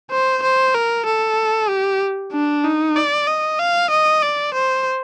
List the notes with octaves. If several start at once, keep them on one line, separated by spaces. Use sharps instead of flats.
C5
C5
A#4
A4
G4
D4
D#4
D5
D#5
F5
D#5
D5
C5